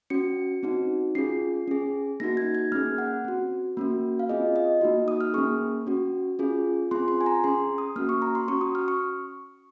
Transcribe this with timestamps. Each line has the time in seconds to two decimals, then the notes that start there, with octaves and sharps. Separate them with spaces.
0.10 C#4 F#4 C#7
0.63 C4 D#4 F#4
1.15 C#4 F4 G#4 C7
1.68 C#4 G#4
2.20 A#3 D#4 F#4 A#6
2.37 G#6
2.55 G#6
2.72 A#3 C#4 G#4 F6
2.98 F#5
3.24 C4 F#4
3.77 A#3 C#4 F#4
4.19 F5
4.29 C4 F4 G#4 D#5
4.56 D#5
4.81 A#3 D#4 F#4
5.08 D#6
5.21 F6
5.34 A#3 C#4 G#4 C#6
5.87 C#4 F#4
6.39 C#4 F4 G#4
6.91 C4 F4 G#4 C6
7.08 C6
7.21 G#5
7.26 A#5
7.44 C#4 G#4 C6
7.78 D#6
7.96 A#3 C#4 F#4 F6
8.09 C#6
8.22 A#5
8.35 C6
8.48 C#4 F#4 C#6
8.61 D#6
8.75 F6
8.88 C#6